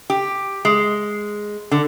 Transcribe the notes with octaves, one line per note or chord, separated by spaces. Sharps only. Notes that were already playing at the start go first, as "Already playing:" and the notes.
G4
G#3
D3